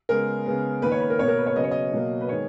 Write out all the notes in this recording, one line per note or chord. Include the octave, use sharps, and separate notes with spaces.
C#3 G#3 B3 A#4
C#3 G#3 B3
D#3 A#3 B4
C#5
B4
A#4
B2 A#3 C#5
A#4
B4
C#5
C#3 F#3 B3 D#5
C#5
D#5
B2 F#3 A#3
B4
D#3 G#3 B3 C#5